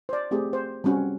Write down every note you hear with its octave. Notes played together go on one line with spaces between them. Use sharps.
C5 D5
A3 C4 G4 G#4
C5
G3 C4 C#4 F#4